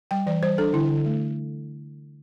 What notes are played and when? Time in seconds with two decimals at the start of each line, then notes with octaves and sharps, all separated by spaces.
0.11 G3 G5
0.26 E3 D5
0.42 G3 C5
0.58 D4 A4
0.73 D3 E4
0.90 D3
1.06 A3